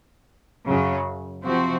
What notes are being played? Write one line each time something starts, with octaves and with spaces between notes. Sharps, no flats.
F#2 C#3 F#3
C3 F3 C4 F#4